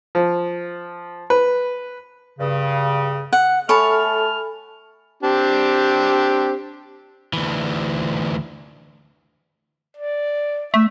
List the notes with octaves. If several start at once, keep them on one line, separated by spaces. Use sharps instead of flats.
F3
B4
G2 C#3
F#5
A3 A4 C#5 G#5 A5 B5 F6
C4 D4 G4
D2 E3
D5
A3 E5